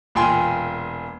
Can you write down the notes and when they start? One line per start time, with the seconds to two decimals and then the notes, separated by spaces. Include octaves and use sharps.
0.15 E1 A#2 F4 G5 G#5 C6